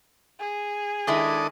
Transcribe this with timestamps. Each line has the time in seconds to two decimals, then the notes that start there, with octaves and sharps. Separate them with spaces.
0.39 G#4
1.07 D#3 G#3 D4 E4 A4 D#6